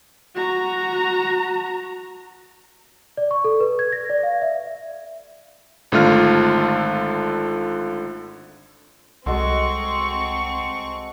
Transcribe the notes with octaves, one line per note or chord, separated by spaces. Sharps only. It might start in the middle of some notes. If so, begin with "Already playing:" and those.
F#4 A#5
D5
C#6
A4
B4
G#6
A#6
D5
F5
E5
G#1 D3 A3 F4 F6
C2 G#3 C4 F#4 A4 C6 C#6